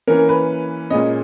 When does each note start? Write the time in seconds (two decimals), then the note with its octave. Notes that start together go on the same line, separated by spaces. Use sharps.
0.07 E3 A#3 C#4 A#4
0.29 B4
0.90 A#2 G#3 C#4 D#5